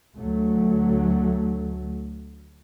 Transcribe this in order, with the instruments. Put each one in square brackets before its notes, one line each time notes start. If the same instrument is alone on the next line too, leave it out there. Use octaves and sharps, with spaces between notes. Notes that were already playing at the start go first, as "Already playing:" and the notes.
[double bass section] D2 F#3 A3